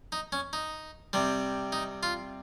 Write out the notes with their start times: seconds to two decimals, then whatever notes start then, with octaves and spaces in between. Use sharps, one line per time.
0.12 D#4
0.32 C#4
0.53 D#4
1.13 C3 G3
1.72 D#4
2.03 F4